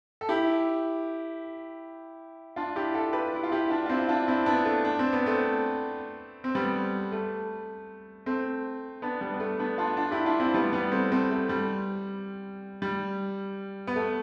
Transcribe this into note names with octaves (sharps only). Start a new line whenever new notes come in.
A4
E4 G4
D4 F4
E4 G4
F4 A4
G4 B4
E4
F4
E4 G4
D4 F4
F4
C4 E4
D4 F4
C4 E4
B3 D4
A3
D4
C4
B3
A3 C4
C4
G3 B3
A3
A3 C4
B3 D4
G3 B3
B3
A3
B3 D4
D4 F4
D4 F4
E4 G4
D4 F4
C4 E4
G3 B3
G3 B3
A3 C4
A3 C4
A3
G3
G3
B3
A3